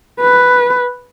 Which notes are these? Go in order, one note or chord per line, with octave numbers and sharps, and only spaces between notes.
B4